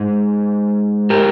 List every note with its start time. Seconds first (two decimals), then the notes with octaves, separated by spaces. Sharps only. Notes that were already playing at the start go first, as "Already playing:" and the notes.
Already playing: G#2 G#3
1.10 G4 A#4